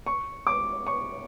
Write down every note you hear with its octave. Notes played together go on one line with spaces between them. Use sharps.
C#6
D6
C#6